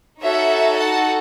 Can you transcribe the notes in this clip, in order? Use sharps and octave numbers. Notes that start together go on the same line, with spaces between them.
D#4 F#4 A4 C#5 E5
F#5 A5